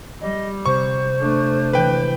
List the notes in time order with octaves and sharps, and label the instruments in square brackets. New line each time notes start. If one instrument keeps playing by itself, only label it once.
[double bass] G3 [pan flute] D#5
[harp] C3 [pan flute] C5 [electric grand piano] C#6
[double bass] A3 D4
[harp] E3 G#3 [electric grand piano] B4 G5